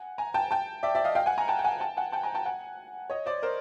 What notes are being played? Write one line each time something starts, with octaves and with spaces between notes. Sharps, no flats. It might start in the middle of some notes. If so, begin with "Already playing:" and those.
Already playing: F#5 G#5
G#5 A#5
G5 A5
G5 A5
D5 E5
D5 E5
D#5 F5
F5 G5
F#5 G#5
G#5 A#5
G5 A5
G5
F#5 G#5
G5 A5
F#5 G#5
G5 A5
G#5 A#5
G5 A5
F#5 G#5
C#5 D#5
C5 D5
A#4 C5